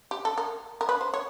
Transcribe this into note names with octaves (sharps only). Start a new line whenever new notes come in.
G4
A4
A#4
A#4
B4
C5
C#5